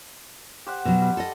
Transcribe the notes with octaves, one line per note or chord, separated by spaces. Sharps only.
G4 C5 F#5
B2 F#3
G3
A4 D#5